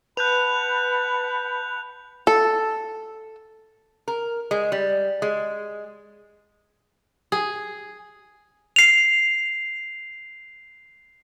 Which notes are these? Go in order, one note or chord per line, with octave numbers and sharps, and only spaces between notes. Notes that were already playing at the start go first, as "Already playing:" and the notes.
B4 F#5 A5 B5 F#6 G6 F7
A4
A#4
G#3
G3
G#3
G#4
C7 F7